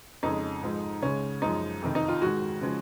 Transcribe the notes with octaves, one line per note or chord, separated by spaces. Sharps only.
F2 C#3 G#3 D#4
G#2 F3 G#3
C#2 C#3 G#3 C#4
F#2 F3 G#3 D#4
F2 C3 D#3
D#4
F4
G#2 D#3 G#3 F#4
C#3 F3 G#3